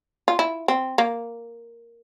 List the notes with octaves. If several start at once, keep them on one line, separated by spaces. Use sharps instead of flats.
F4
E4
C4
A#3